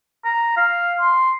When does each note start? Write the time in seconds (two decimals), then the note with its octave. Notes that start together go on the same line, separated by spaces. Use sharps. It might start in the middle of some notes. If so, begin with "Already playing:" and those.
0.25 A#5
0.57 F5
1.00 C6